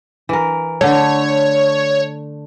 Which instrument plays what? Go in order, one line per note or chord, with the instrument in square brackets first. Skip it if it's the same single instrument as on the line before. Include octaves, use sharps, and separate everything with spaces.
[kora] E3 A#4
[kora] D3 A3 [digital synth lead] C#5